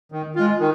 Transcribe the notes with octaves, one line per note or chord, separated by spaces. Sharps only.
D#3
G#3 F4
D#3